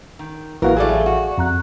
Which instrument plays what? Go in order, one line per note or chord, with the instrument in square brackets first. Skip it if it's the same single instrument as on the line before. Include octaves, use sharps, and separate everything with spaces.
[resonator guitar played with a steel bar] D#3
[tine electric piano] A1 F5 [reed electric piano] E3 A#3 F#4 [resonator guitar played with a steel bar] A#4
[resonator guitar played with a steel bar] F#3 G3 A3 [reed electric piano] G#4 D5
[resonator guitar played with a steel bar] F#4
[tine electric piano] F2 A#5 F#6